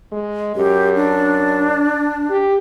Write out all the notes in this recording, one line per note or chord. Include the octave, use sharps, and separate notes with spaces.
G#3
F#2 G4
D4
G4